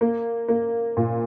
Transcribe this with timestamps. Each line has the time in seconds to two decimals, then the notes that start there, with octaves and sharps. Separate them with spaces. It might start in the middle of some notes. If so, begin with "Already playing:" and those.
0.01 A#3
0.48 A#3
0.97 A#2